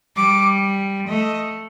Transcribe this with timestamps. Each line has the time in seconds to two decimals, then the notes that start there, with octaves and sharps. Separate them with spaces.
0.16 G3 D6
1.09 A3 D#5